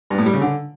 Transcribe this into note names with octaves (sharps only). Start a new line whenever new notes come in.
G2
A2
G3
C#3
D3